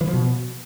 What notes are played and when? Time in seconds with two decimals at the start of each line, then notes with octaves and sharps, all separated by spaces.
0.01 E3
0.07 F3
0.13 B2